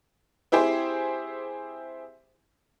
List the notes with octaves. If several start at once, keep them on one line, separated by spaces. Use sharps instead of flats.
C4 E4 G4 G#4 C5